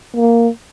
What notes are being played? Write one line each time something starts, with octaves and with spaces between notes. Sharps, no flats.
A#3